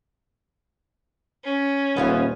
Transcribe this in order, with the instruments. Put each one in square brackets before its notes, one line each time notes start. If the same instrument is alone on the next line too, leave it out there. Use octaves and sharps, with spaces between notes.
[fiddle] C#4
[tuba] D#1 [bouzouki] B3 C5 F5